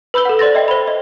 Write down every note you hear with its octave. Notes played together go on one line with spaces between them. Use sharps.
B4 B5 E6 G6 G7
A4 F#5
C5 D5 C6 A6 A#6
D#5 E5 G5
C5 B5
D#5